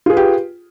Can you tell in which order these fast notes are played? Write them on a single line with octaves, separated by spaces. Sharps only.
F4 G#4 B4 G4